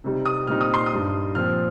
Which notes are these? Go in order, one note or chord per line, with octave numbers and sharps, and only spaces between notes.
C3 G3 D#4
D#6
A#2 G3 C4 D#4 F6
D#6
C6
D#6
G2 G3 D#4
A#2 F3 C4 F6